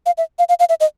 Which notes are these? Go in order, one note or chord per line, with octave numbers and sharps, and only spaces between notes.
F5
E5
F5
F5
F5
E5
D#5